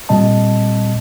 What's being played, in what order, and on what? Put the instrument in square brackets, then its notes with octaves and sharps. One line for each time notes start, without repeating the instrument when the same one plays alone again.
[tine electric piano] A#2 G3 C4 D#5 A5